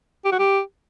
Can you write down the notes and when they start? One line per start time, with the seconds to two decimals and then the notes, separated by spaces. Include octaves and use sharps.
0.25 G4
0.32 F#4
0.39 G4